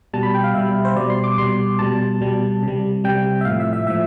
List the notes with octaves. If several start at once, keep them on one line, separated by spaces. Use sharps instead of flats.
B2 G3 A5
B5
G5
F5
B2 G3 E5
C5
B2 G3 D5
C6
D6
B2 G3 C6
B2 G3 A5
B2 G3
C3
G3
C3 G3 G5
E5
A2 F3 F5
E5
E5
A2 F3 E5